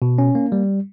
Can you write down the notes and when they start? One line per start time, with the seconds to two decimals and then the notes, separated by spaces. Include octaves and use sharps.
0.02 B2
0.18 C#4
0.35 A#3
0.52 G3